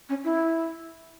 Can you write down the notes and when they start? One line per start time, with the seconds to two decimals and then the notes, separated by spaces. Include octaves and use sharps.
0.09 C#4
0.24 E4